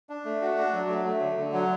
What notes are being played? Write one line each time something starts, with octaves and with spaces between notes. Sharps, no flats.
D4
A3
F#4
D4
F#3
A3
A3
D3
D3
F#3